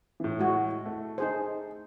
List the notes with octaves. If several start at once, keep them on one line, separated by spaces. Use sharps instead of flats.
A2 E3
G#3 F#4
A3
D#4 G#4 C5